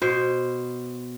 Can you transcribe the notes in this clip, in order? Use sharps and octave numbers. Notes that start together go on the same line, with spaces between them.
B2 C5